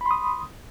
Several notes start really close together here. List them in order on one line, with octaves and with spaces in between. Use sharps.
B5 C6 D#6